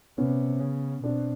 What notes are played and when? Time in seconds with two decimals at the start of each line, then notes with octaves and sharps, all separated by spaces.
0.18 C3 B3 C#4
0.60 C#3
1.03 B2 C4 D4